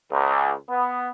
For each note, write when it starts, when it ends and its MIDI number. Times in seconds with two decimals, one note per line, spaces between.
0.11 0.51 37
0.69 1.09 59